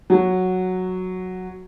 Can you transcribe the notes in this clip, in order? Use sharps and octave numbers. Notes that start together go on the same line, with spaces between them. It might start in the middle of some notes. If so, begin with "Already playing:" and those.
F#3